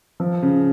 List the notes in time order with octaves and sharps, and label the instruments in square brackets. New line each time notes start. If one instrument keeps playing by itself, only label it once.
[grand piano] F3
C#3